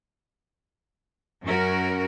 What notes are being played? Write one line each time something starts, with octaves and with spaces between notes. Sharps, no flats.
F#2 C#4 F#4 A#4